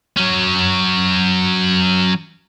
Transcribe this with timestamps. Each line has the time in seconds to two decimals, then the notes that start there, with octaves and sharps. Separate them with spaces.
0.17 F#3 C#4